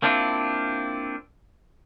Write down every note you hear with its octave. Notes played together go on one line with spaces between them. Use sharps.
A#3 C4 D4 E4 F4